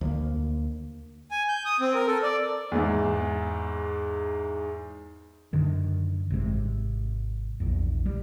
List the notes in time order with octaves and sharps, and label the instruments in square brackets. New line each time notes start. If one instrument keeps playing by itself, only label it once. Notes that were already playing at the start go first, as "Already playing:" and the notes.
[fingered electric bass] D2 A#3
[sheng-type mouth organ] G#5
G6
D#6
C4
A#4
A4
D5
[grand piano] E2 G#2
[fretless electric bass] F#2 D3 D#3
G#1 C3 G#3
A#1 E2
G3